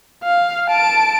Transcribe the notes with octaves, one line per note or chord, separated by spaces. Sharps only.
F5
A5 D7